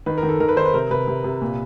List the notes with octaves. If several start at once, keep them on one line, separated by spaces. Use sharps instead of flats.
D#3 B4
A#4
D#3
A4
D#3 A#4
B4
D#3 C5
B4
C3 A#4
C3 B4
C3
C3
A#2